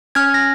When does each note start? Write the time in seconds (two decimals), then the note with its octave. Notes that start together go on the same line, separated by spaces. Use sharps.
0.15 C#4 F6 G#6
0.34 A#6